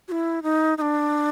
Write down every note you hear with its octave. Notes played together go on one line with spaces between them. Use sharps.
F#4
E4
D#4
D#4
D4